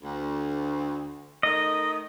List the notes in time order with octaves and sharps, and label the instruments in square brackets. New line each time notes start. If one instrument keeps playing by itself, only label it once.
[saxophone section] D2
[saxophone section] D#3 A3 [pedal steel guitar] D#5